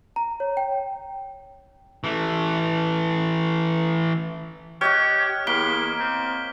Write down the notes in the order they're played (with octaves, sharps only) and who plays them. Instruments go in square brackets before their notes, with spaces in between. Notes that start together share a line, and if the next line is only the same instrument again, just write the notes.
[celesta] A#5
C#5
G5
[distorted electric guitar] E3 A3
[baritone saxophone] G4 [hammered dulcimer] C#5 D#5 F#5 [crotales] F6
[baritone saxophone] E2 [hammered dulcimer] A#3 [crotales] B6 D7 G7
[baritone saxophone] C4